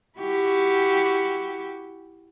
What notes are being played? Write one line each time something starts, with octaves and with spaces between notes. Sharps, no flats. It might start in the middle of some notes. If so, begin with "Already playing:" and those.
E4 F#4 G4